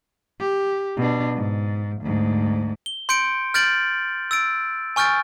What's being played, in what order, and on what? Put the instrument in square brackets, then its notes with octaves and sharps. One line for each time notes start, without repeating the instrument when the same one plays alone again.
[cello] G4
B2 D4
G#2
D2 G#2
[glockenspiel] G7
C6 G6 C#7 D7
F6 G6 A6 D7 F#7
E6 A6 D7
G#5 C#6 F6 G6 A6 D7